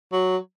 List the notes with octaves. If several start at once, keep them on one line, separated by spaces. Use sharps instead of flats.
F#3